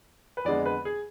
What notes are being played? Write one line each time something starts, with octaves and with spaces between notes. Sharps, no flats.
B4
F2 D3 G#3 B3 D5
B4
G#4